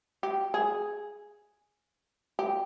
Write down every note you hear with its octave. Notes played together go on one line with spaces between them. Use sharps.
G4
G#4
G4